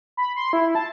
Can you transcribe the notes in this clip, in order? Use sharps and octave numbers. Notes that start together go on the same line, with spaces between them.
B5
C6
E4
A5